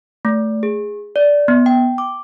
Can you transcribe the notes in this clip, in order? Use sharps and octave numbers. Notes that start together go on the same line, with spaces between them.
A3
G#4
D5
B3
G5
D6